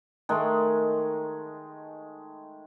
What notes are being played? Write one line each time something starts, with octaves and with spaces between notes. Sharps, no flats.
D#3 G#3 A3